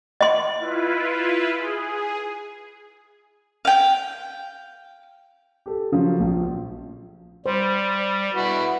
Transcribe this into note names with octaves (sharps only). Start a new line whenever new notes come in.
D#5 C6
E4 F4 B4
G#4
F5 G5
G4 A4
C#3 F3 F#3 C#4
A#1
G3 C5
E4 F#4 B4